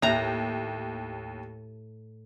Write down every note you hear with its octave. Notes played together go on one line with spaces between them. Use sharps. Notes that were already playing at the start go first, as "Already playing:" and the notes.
D#2 A2 A#5